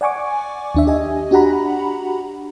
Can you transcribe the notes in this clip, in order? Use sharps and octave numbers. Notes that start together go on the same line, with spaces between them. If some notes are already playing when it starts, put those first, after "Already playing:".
D5 F#5 G#5 C#6 D6
D#2 D4 E5
G4 D#5 G#5
D4 F#4 G4 F#5 A#5 B5